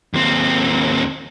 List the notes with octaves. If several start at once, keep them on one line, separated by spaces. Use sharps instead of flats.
D#2 C4